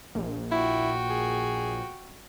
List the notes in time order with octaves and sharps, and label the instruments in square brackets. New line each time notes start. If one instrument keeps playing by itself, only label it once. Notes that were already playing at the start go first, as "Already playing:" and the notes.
[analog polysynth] A#1
[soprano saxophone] E4 [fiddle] F#4 G5
[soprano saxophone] G#4